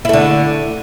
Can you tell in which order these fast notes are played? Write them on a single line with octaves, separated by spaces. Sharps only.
E4 A3 D3